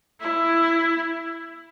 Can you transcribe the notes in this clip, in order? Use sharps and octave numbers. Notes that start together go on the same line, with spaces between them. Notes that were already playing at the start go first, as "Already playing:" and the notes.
E4